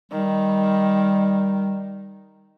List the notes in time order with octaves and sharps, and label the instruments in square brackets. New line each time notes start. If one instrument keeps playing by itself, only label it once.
[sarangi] D#3 [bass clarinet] G3